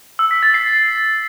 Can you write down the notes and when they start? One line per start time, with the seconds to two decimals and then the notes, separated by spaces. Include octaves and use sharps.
0.19 E6
0.31 B6
0.43 A6
0.54 C7